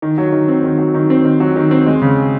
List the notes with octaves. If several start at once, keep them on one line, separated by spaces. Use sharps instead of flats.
D#3
F#3
D#3
C4
D#3
F#3
D#3
C4
D#3
F#3
D#3
C4
G#3
C#3